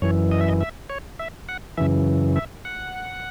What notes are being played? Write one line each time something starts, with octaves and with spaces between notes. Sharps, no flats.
F#2 E3 C#5
D#5
E5
D#5
E5
C#5
E5
F#5
F#2 C#3 E3 E5
E5
F#5